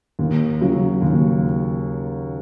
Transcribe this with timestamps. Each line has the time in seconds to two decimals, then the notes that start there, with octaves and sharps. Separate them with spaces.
0.19 D#2
0.61 C#3 F#3
1.02 D#2